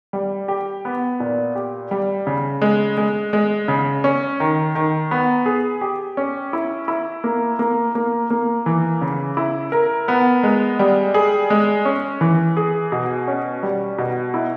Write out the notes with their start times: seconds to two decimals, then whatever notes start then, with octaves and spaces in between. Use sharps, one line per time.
0.13 G3
0.48 G4
0.85 B3
1.20 A#2
1.55 G4
1.91 G3
2.27 C#3
2.62 G#3
2.97 G#3
3.33 G#3
3.68 C#3
4.04 C#4
4.40 D#3
4.75 D#3
5.11 B3
5.46 G#4
5.81 G4
6.17 C#4
6.53 E4
6.88 E4
7.24 A#3
7.59 A#3
7.95 A#3
8.30 A#3
8.66 E3
9.01 C#3
9.37 E4
9.72 A#4
10.08 B3
10.43 G#3
10.79 G3
11.14 G#4
11.50 G#3
11.85 C#4
12.21 E3
12.57 G#4
12.92 B2
13.28 C#4
13.63 G3
13.98 B2
14.34 E4